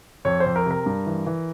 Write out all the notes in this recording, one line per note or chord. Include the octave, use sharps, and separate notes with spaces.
F2 C#5
C5
F2
A#4
C3 A#4
G2
E3
E3